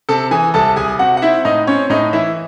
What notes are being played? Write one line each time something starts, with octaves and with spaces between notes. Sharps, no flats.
C3 A4 A5
E3 G#4 G#5
C2 A4 A5
C2 G#4 G#5
C3 F#4 F#5
F#5
C4 E4 E5
A2 D#4 D#5
C4 C#4 C#5
A2 D#4 D#5
E3 E4 E5